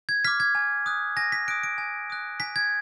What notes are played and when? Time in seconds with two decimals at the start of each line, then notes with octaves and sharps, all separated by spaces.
0.09 G#6
0.25 D6 F6 B6
0.40 G#6
0.55 G#5
0.86 D#6 F#6
1.17 G#5 A#6
1.32 B6
1.48 D#6 F#6 D7
1.63 D7
1.78 G#5
2.10 D#6 F#6
2.40 G#5 B6
2.56 G#6